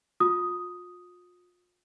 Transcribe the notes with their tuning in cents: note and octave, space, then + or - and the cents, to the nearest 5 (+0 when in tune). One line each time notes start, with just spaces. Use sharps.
F4 +35 D#6 +0